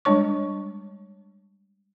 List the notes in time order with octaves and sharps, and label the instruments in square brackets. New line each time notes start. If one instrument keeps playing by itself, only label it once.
[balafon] G3 G#3 D4 C#5 C#6